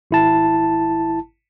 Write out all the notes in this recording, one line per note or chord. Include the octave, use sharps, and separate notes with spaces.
G#1 E4 A5